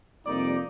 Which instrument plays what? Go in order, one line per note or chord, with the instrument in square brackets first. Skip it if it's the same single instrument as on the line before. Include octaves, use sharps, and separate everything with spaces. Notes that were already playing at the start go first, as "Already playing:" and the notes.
[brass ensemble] F2 C3 G3 A#3 D#4 D5